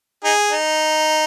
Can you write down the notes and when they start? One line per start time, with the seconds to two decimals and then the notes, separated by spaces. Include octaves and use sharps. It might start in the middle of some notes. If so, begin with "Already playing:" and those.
0.24 D#4 G#4
0.51 D#4